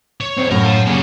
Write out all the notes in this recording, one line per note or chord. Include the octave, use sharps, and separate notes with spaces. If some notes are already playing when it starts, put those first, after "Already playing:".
C#5
E2 C4
F#2 A2 A#4
F5 A5
G3 A#3 C#4 G#4